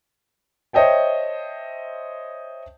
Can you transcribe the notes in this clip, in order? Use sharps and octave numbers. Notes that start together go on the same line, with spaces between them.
C5 C#5 D#5 E5 G5 A5